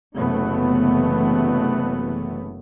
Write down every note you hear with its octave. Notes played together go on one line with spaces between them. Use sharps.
F#1 C3 E3 A3 B3